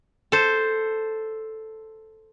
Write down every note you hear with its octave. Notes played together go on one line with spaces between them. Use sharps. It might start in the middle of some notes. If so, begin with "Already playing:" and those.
A4 C5